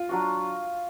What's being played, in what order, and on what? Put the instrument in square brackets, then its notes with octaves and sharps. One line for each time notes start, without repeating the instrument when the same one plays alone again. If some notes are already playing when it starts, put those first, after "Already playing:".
Already playing: [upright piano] F4
[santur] F#3 D4 F#4